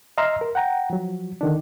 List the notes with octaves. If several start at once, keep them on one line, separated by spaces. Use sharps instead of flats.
D#5 E5 A#5 C6 E6 F6
A#4
F#5 G5 A#5
F3 F#3
D3 D#3 D4